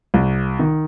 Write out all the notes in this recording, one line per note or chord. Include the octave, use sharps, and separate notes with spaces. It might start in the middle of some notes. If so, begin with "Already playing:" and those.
C2
D#3